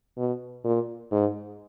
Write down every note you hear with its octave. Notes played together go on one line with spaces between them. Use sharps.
B2
A#2
G#2